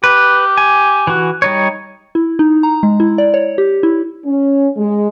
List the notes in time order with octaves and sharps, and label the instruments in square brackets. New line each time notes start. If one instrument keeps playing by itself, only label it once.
[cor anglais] G4 [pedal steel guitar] B4
[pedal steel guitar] G#5
E3 F#4
G3 D#4 C#5
[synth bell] E4
D#4
A#5
G#3
E4
D5
C#5
G4
E4
[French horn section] C#4
G#3